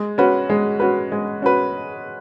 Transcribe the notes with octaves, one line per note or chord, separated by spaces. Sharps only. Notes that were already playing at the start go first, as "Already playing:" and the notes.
Already playing: G#3
C#4 F#4 B4
G#3
C#4 F#4 B4
G#3
C#4 F#4 B4